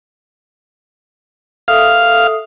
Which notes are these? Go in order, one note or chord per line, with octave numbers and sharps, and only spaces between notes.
A4 E5 F5 D#6